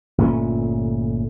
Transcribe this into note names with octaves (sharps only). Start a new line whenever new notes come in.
G1 A#2 A3 C#4